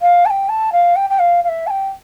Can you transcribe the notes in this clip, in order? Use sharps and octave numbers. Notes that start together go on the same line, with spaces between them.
F5
A5
G5
A5
F5
G5
G5
F5
F5
E5
A5
G5